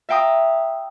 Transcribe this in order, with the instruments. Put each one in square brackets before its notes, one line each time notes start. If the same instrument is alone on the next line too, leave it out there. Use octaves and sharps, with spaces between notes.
[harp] E5 F5 G5 A#5 D#6